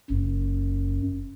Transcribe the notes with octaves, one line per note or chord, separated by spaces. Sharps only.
F#1 F#2